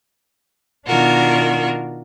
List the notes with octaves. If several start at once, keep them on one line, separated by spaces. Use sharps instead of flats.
B2 D#3 D4 F4 F#4 A#4